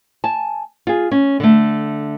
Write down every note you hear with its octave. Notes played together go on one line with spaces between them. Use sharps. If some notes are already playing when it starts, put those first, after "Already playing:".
G#5 A5
F4 G#4
C#4
D3 A3